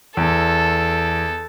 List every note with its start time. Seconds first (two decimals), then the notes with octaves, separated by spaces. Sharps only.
0.17 E2 A4